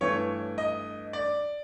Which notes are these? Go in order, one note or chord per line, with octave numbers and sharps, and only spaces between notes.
G2 E3 A3 C#5
D#5
D5